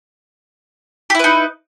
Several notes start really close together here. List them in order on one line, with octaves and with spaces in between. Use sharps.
G4 E4 B4 D#4